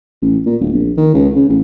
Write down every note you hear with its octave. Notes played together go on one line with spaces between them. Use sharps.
A1
A#2
D1
A#1
D#3
C#2
C#3
A1